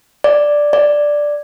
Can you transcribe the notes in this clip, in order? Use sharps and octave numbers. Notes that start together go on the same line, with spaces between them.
D5
D5